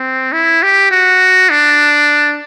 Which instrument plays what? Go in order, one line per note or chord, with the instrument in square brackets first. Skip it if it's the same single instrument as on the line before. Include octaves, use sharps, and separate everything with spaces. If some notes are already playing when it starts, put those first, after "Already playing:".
Already playing: [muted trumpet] C4
E4
G4
F#4
D4